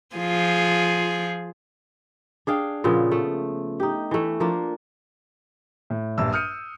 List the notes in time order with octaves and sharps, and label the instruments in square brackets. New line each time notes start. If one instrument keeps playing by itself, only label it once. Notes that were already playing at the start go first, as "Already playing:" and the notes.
[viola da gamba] F3 F4 G#4
[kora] D4 G#4 F5 G5
A#2 C#3 F3 B3
A3
D#4 G4
E3 A3
F3 A#3 D4
[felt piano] A2
A#1 G2 E6
D#6 F6 G6 C#7 D#7